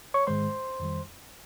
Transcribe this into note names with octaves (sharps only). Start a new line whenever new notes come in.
C#5 C#6
G#2 D#3 G#3 C5 C6
F2 D#3 G3